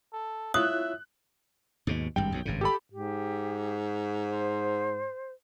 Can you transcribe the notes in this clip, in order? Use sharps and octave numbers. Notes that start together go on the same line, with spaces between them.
A4
E4 F4 C#5 E5 D#6 F#6
D#2 G#2 B2
G#1 G2 G3 G5
B1 F#2 C3
G#1 G2 C#3
G4 A4 B5
G#2 G4
C5